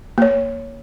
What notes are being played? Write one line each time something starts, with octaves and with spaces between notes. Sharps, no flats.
A#3 C#5